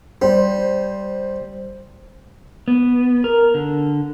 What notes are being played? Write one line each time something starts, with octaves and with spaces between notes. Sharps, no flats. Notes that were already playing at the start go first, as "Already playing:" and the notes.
G3 C5
B3
A#4
D3